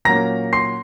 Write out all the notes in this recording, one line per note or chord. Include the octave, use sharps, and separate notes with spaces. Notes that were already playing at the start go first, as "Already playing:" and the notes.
A#2 F#3 A#3 C#4 A#5 A#6
C6 C7